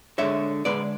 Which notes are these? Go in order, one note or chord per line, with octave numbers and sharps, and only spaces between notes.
D3 G#3 C#5 E5
D3 G#3 B4 D5